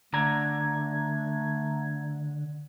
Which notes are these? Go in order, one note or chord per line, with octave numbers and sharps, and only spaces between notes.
D3 A3 A#5 G#6